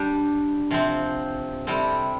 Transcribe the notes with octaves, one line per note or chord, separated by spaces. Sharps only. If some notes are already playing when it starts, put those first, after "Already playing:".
Already playing: G3 D4 G4
C3 F3 C4
C3 G3 C4 E4 A4